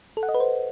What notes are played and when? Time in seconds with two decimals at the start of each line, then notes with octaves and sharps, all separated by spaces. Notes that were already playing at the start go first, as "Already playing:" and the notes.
0.17 A4
0.23 F#5
0.29 D#5
0.34 B4
0.40 C5